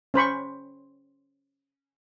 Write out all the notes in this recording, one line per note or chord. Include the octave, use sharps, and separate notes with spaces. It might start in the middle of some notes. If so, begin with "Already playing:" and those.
C#4 C5 B5 C#6